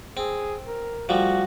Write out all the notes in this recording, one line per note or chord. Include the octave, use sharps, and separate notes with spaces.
C4 G#4
A#4
F3 G3 A3 F#4